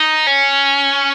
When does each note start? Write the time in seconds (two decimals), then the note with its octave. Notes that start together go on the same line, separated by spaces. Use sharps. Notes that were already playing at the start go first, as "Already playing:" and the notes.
Already playing: D#4
0.27 C#4